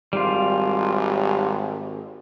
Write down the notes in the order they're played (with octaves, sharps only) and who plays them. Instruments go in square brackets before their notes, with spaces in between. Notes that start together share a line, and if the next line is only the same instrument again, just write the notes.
[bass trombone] G#1 [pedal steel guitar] G3 F4